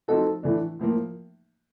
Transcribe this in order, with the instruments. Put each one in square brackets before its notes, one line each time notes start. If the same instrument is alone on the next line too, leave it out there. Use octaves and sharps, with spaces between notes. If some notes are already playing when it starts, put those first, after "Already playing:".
[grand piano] F3 A3 C4 D#4 F#4 [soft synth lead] A4
[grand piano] A2 E3 A3 D4
A2 F3 A#3